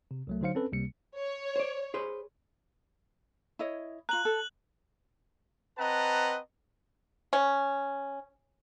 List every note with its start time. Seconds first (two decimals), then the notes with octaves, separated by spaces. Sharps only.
0.11 C3
0.27 C2 F#3 A3
0.41 D3 F#3 D#4 C5 F5 C#7
0.55 C4 C#4 A4 B4
0.72 C#2 C3 G3 A#3 C#7
1.17 C#5
1.56 C5 D5
1.94 G#4 B4 C5
3.59 E4 C#5 D#5
4.09 F4 A#5 F#6 F#7
4.25 A4
5.78 C4 B4 D#5 F#5 A5 A#5
7.33 C#4